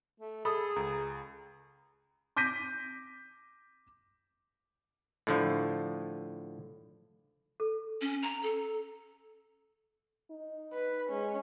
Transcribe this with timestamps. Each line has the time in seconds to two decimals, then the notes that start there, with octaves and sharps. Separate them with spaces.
0.20 A3
0.45 G#4 A4 B5 D#6
0.76 C#2 A#5
2.36 D6 G6 A#6 B6 D#7
5.27 A2 D3 F3
7.60 A4
8.01 C#4
8.23 A#5
8.43 A4
10.30 D#4
10.73 B4
11.10 G#3 C#4